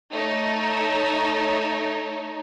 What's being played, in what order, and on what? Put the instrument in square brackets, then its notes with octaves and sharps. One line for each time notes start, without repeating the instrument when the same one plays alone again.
[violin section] A3 D#4 C#5